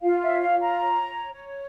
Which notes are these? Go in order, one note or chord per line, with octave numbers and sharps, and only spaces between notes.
F4 F5
E5
C#5
F5
F4
A#5
C#5
C#5
C#5